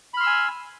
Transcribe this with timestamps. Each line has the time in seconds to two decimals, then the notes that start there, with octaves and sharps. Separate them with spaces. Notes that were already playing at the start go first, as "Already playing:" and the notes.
0.14 B5
0.17 F6
0.20 C6
0.23 E6
0.27 G#5